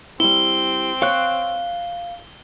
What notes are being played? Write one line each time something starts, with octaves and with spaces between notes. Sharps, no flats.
G3 C4 E4 G7
C#5 F5 F#6